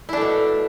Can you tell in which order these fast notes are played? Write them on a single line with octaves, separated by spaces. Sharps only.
E4 D4 A3 B2